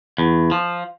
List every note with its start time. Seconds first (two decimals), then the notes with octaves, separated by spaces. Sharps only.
0.18 E2
0.51 F3